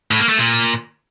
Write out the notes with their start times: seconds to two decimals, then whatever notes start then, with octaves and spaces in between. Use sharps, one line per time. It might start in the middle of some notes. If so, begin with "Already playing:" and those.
0.11 A2
0.20 A#3
0.29 A3
0.38 A#2